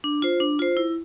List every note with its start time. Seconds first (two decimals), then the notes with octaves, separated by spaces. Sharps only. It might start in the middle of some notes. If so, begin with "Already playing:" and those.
0.04 D4
0.22 F4 C5
0.40 D4
0.59 F4 C5
0.77 E4